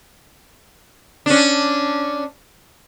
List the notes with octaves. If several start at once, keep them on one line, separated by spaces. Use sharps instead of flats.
C#4 D4